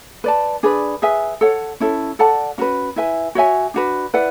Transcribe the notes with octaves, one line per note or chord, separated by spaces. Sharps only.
B4 D5 A5
D4 G#4 B4 D5
G#4 B4 E5 G#5
A4 C#5 F#5
C#4 E4 A4
A4 D5 F#5 A5
C#4 F#4 B4
E4 B4 E5 G#5
F#4 C#5 E5 G#5
D4 F#4 B4
E4 B4 D5 F#5